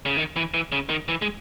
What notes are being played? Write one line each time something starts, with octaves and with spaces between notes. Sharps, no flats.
C#3
D#3
E3
E3
C#3
D#3
E3
G#3